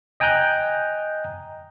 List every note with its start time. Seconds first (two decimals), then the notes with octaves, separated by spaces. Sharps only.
0.20 D#5 G5 G#5 A#5 F#6 G6